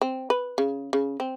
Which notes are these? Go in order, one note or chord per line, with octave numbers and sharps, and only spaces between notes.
C4
B4
C#3
C#3
C4